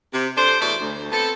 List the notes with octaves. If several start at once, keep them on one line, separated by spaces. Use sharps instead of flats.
C3
D4 A4 C5
E2 B2 A3 C#5 D5
D2
B3 C4 A4